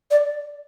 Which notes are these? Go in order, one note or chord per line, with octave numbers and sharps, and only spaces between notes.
D5